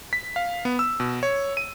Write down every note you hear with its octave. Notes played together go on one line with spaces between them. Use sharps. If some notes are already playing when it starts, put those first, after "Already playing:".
B6
F5
B3
E6
B2
C#5
D#7